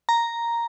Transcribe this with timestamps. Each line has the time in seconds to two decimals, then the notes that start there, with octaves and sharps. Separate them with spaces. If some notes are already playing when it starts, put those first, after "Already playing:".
0.09 A#5